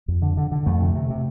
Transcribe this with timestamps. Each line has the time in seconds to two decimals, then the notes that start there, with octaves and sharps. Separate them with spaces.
0.08 F2
0.22 D3
0.37 D3
0.52 D3
0.66 F2 A3
0.81 C3
0.95 C3
1.10 C3